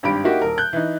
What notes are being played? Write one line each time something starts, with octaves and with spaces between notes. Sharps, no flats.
G#1 G2 G4 B5 D7
A#3 D#4 E4 F#4 G4
D#1 A#4
F#6 G6
E3 D#4